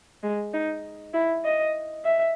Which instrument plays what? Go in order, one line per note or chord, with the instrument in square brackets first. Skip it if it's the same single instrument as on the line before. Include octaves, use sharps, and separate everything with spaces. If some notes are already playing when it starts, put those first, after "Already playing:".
[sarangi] G#3
D#4
E4
D#5
E5